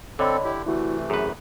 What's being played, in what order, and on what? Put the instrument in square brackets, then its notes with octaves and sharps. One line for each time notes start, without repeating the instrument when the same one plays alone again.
[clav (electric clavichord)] D3 [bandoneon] C4 A4 [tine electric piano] C#5 D#5 B5
[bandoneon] E4 G4
[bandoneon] C3 E3 A3 [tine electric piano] E4 F#4
[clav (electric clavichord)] F#2 B4 [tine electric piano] G#4